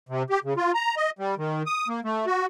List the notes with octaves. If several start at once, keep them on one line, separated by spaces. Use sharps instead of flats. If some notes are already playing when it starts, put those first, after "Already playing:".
C3
G4
C#3
F4
A#5
D#5
G3
D#3
D#6
A#3
A3
F#4